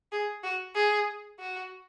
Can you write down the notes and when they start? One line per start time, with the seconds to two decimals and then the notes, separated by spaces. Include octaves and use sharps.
0.12 G#4
0.43 F#4
0.75 G#4
1.40 F#4